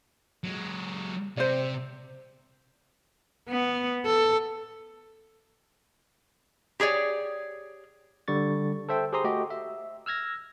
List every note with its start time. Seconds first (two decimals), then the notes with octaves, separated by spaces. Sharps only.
0.44 F#3 G#3
1.37 C3 C5 D5
3.48 B3
4.05 A4
6.80 G4 G#4 C#5 D5
8.28 D3 G3 C#6 A6
8.89 A4 C5 E5 G5
9.13 G4 G#4 C5 A#5 C6 D#6
9.24 A3 F#4 G4 D#5
9.51 E5
10.06 E6 F6 G#6 A#6